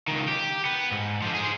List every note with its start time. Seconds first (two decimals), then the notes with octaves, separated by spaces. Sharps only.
0.07 C#2 D#3
0.28 G4
0.65 B3
0.91 G#2
1.22 D3 F3
1.35 G#4 C5